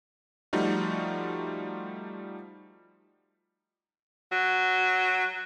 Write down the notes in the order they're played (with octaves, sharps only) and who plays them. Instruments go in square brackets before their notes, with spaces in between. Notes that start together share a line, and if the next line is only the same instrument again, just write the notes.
[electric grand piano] F3 G3 A3 D#4 F4 F#4
[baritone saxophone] F#3